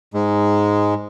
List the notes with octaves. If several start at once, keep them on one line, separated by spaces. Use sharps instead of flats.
G#2 G#3